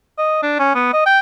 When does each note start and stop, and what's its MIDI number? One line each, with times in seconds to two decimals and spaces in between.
0.18 0.38 75
0.43 0.59 62
0.59 0.74 61
0.75 0.89 59
0.93 1.03 75
1.06 1.20 79